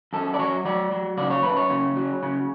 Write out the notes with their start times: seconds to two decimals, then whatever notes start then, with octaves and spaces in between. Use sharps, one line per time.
0.13 F#2 A4
0.34 D5
0.39 F#3 C#5
0.65 F#3 D5
0.91 F#3
1.17 C#3 D5
1.30 C#5
1.43 F#2 B4
1.57 C#5
1.70 C#3
1.96 F#3
2.23 C#3